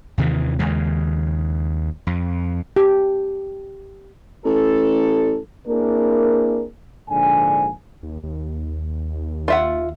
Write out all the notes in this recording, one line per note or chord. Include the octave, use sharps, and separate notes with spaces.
D#2 C3 D#3 E3
D#2 C#3 G#3
F2
G4
A1 A4
A#3 C4 D4 E4 G#4 A#4
A#1 G#2 D3 G#5
D#2
D#2
F4 E5 F#5